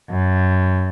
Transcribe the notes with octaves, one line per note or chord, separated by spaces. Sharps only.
F#2